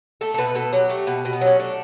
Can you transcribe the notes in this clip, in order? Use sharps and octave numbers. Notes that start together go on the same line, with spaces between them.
A3 A4
A4
B2 B4
B2 A4
F#3 G4
A3
B2
B2
B3
F#3
C#4
A3 D4